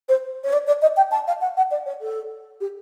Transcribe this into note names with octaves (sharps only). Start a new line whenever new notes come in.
C5
C#5
D5
D5
D#5
G5
A5
F5
F#5
F#5
D5
C#5
A4
G4